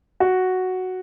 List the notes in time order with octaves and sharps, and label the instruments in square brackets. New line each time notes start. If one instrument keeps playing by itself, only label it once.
[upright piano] F#4